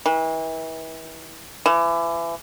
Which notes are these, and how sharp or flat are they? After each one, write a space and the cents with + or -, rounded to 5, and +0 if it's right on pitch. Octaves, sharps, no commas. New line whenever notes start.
E3 -35
E3 +30